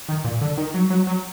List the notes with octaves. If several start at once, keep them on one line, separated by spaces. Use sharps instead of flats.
D#3
A#2
D3
D#3
F#3
F#3
F#3